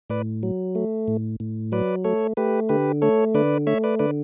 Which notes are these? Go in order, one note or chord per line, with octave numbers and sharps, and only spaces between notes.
A2 B4 D5
F#3
A3
A2
A2
F#3 B4 D5
A3 A4 C#5
A3 G4 B4
D3 G4 B4
A3 A4 C#5
D3 B4 D5
A3 C#5 E5
B4 D5
D3 B4 D5